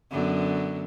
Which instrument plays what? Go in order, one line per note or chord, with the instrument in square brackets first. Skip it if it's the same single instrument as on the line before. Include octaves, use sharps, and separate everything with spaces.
[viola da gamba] F#2 D3 B3